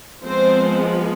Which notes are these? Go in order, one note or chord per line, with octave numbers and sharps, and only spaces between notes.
F3 G#3 B3 C4 C5